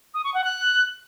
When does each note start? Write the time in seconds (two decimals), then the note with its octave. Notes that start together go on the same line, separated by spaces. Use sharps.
0.14 D#6
0.24 C#6
0.34 F#5
0.44 F#6